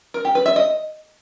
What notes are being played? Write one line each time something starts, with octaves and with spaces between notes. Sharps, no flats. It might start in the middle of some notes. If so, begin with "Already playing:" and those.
A#4
G4
B4
E5
D#5